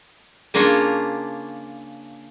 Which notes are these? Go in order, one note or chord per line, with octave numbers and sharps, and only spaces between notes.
C#3 A#3 D4 F4 A#4 C#5